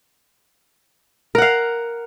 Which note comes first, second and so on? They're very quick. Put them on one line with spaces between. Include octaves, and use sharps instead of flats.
A#4 F#5 F5